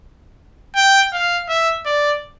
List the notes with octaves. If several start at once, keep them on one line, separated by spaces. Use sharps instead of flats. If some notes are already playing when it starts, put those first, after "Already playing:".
G5
F5
E5
D5